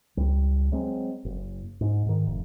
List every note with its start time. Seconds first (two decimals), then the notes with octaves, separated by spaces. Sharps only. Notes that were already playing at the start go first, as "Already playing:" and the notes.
0.17 C#2 G3
0.72 F#3 G#3 C4
1.25 F#1
1.81 G#2
2.06 G#2 D#3
2.27 F1